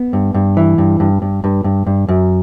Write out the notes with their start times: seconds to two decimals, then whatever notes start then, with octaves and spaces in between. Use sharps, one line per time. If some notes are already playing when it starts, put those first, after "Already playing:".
Already playing: B3
0.13 G2
0.34 G2
0.57 E3
0.78 G2
1.00 G2
1.22 G2
1.44 G2
1.64 G2
1.87 G2
2.09 F#2